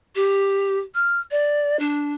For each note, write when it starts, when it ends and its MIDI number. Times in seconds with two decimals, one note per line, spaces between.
0.15 0.79 67
0.94 1.19 89
1.30 1.78 74
1.79 2.14 62